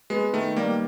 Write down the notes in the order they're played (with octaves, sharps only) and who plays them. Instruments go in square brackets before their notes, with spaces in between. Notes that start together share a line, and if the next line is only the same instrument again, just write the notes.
[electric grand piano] G#3 [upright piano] B3
[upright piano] D#3 [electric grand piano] A3
[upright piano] G3 [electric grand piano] A#3